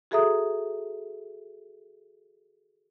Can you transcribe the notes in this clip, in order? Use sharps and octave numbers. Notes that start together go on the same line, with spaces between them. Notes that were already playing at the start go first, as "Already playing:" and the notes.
F#4 G#4 A4 E5 A#5 D#6